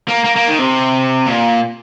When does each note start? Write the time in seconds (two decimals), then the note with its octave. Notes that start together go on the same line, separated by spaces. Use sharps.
0.08 A#3
0.24 A#3
0.36 A#3
0.47 D#3
0.58 C3
1.26 A#2